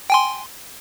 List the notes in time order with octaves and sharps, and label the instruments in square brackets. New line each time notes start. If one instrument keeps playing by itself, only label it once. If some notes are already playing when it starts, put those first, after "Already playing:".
[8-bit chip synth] G5 G#5 C6